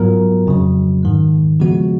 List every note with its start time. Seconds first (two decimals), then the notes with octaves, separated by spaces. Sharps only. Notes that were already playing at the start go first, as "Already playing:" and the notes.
Already playing: G#2 F#3 B3 F4 A#4
0.47 F2 C#3 F#3
1.03 G#2 D#3 G#3
1.60 C#3 F3 G#3 B3 F#4